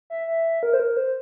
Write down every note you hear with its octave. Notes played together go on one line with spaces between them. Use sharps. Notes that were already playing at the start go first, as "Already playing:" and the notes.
E5
E5
A#4
C5
A#4
C5